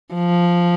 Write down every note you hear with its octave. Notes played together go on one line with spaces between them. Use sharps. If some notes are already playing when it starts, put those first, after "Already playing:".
F3